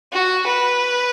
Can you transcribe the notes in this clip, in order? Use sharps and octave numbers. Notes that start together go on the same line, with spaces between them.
F#4
B4